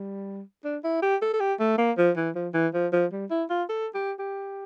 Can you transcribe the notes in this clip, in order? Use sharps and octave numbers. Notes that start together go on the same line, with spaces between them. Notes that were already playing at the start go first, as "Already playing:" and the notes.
Already playing: G3
D4
E4
G4
A4
A4
G4
A3
A#3
F3
E3
F3
E3
F3
F3
G3
E4
F4
A4
G4
G4